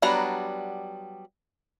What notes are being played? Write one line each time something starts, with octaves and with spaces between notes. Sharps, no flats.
F#3 G3 B3 D4 A#5